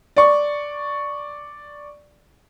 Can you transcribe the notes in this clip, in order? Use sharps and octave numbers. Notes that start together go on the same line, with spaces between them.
D5 C#6